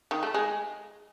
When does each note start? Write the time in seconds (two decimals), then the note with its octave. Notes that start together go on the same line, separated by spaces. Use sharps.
0.11 D#3
0.23 A3
0.34 G#3